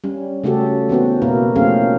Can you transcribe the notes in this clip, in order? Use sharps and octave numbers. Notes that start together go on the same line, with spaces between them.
G3 C#4
C#3 A3 C#4 F#4 G4 A4
E3 B3 C4 F#4
B2 A#3 E4 A#4
F3 A3 C4 C#4 G#4 F5